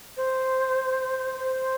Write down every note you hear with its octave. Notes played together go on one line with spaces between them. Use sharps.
C5
C5